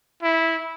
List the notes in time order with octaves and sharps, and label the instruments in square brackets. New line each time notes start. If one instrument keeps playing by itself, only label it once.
[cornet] E4